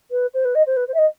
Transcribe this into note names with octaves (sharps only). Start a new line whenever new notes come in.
B4
C5
B4
D#5
C5
B4
C5
E5
D#5